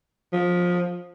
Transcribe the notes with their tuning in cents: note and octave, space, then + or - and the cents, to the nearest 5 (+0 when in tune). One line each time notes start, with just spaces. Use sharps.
F3 +25